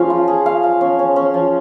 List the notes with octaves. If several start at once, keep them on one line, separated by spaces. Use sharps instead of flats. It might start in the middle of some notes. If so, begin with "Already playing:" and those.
Already playing: F3 C#4 G#4 F5
F4
G#4
F5
F5
C#4
C#4
C#4
F3